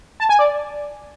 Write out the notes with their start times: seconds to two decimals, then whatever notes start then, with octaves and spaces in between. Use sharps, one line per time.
0.20 A5
0.29 G#5
0.39 D5